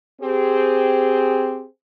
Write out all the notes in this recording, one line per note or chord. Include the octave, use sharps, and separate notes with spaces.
C4 G4 G#4